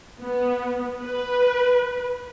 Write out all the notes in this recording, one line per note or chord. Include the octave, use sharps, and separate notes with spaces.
B3
B4